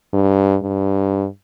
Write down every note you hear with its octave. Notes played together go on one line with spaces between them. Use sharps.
G2
G2